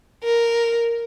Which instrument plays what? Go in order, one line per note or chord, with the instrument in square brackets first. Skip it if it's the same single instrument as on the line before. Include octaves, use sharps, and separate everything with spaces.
[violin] A#4